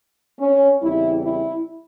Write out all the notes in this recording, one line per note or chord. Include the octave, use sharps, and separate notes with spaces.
C#4
E2 C#3 G3 C4 E4
E4